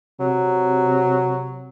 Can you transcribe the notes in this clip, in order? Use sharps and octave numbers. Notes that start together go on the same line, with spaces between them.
C3 F#3